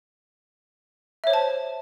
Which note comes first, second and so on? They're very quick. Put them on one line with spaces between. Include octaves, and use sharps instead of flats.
E5 C#5 C5 A5